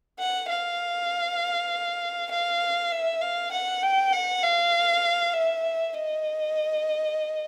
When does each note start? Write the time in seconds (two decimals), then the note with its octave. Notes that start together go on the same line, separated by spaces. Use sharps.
0.20 F#5
0.49 F5
2.31 F5
2.92 E5
3.21 F5
3.52 F#5
3.83 G5
4.12 F#5
4.43 F5
5.33 E5
5.95 D#5